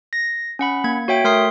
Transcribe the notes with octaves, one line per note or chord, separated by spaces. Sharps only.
A#6
C#4 F#5 B5
A#3 G#6
F#4 C#5 E5 G5 D7
A3 A#4 C6 D#6 C7